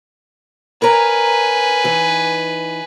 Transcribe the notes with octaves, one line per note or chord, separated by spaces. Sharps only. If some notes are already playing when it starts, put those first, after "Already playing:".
A#4 B4 C#5 G#5 A#5
E3 D#4